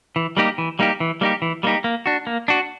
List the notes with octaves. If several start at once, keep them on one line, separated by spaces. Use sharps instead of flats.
E3
G3 A#3 D#4 G4
E3
G3 A#3 D#4 G4
E3
G3 A#3 D#4 G4
E3
G3 A#3 D#4 G4
A#3
D4 F#4
A#3
D4 F#4